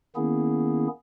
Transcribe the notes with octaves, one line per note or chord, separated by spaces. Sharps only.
D#3 A#3 B3 C#4 E4 G#4